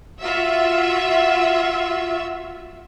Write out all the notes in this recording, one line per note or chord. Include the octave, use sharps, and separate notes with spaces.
F4 F#4 E5